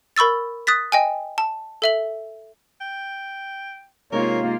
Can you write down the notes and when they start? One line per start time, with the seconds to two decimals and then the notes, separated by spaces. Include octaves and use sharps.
0.16 A#4 B5 C#6 E6 A6
0.67 D#6 F#6 A6 B6
0.92 D#5 G5 G#5
1.38 A5
1.82 A4 E5 F#7
2.81 G5
4.12 C3 G#3 A#3 D#4 F4 A#4 C#5